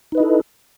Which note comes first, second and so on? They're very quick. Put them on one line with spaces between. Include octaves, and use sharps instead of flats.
D#4 B4 D#5 E4 A4